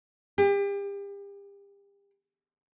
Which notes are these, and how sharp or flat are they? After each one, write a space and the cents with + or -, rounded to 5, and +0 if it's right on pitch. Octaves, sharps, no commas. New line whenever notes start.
G4 +35